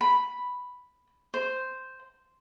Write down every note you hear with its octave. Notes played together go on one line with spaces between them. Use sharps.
B5
C5